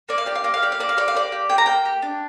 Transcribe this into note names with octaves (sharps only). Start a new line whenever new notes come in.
A#3 D5
F5
G4 D5
F5
A#3 D5
F5
G4 D5
F5
A#3 D5
F5
G4 D5
F5
A#3 D5
G4
A#3 G5
A#5
A#3 G5
G4
D4